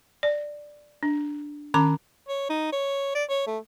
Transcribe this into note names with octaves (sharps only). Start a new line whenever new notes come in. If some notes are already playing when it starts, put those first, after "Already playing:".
D5
D4
D#3 C#4 A#5 D6
C#5
D#4
C#5
D5
C#5
A3